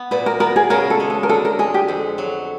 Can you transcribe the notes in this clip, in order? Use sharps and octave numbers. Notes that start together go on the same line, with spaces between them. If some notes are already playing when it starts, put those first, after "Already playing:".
Already playing: B3
A#2 B4
A#4
B3 A#4
G#4
C#3 A#4
A4
G#3
A4
A#4
D3 A4
A#4
G#3 G#4
G4
F2
F#3